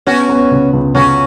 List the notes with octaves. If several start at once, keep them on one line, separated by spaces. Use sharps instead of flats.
B3 C#4 F#4
B3
C#2
C#2
C#2 C#4 F#4